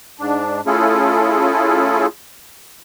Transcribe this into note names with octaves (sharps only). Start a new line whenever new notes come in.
G#2 D4
A3 C#4 E4 F4 G#4 A4